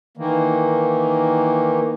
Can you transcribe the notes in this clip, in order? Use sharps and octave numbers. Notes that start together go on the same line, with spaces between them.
D#3 E3 A#3